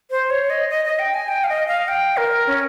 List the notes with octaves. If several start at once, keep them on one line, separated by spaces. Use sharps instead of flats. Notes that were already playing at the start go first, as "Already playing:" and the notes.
C5
C#5
D#5
D#5
D#5
G5
G#5
G5
F5
D#5
F5
G5
A#4
C#4